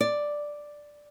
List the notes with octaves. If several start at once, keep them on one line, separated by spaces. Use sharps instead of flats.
D5